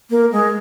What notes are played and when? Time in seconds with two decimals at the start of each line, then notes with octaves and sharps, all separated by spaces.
0.10 A#3
0.32 G#3